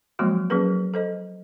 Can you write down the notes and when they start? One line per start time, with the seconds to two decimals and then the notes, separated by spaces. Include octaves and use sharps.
0.19 F3 F#3 G#3 A#3 C4 F#4
0.50 F#3 A#3 C#4 G#4 A#4 B4
0.94 A4 C5 D#5